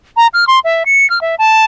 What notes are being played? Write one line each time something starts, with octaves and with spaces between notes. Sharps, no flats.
A#5
F6
C6
E5
C#7
F6
E5
A5